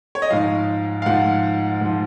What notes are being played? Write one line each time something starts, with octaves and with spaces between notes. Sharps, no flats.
C#5
D#5
G#2 F3 F5
F5
G#2 F3 F#5
G#2 F3